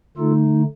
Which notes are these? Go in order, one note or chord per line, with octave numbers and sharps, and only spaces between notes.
D3 A3 D#4 F4 A4